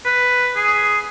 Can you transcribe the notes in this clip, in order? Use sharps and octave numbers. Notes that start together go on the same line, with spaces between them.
B4
G#4